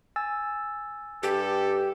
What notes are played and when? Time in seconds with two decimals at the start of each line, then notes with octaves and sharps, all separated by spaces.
0.16 G#5 E6 A6
1.23 G2 G4 A4